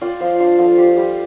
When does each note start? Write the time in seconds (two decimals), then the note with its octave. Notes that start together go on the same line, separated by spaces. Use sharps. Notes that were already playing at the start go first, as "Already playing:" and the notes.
0.01 F4 D5 G5
0.20 F3 C5 F5
0.40 D4 C5 F5
0.58 F3 F4 A4
0.77 F4 G4
0.97 G3 G4